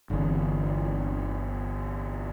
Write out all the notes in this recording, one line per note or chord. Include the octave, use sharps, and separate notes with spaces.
G1 D3 E3